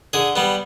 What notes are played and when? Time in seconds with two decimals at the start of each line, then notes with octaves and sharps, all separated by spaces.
0.13 D3 G#4
0.36 G3 B3